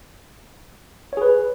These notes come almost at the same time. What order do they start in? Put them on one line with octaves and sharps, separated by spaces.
C#5 G#4 B4